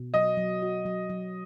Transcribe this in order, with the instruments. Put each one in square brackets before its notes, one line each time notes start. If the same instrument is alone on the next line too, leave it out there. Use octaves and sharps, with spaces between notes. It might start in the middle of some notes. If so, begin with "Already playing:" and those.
Already playing: [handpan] B2
[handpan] F#3 [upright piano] D#5
[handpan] F#3
F#4
F#3
F#3